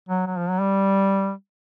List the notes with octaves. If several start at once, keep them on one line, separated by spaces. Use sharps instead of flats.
F#3
F#3
F3
F#3
G3